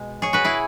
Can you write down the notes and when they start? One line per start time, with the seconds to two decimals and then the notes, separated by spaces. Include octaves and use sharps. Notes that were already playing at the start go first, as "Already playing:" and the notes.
Already playing: B2 G#3
0.22 G#4 C#5
0.33 F#4 B4
0.44 E4 G#4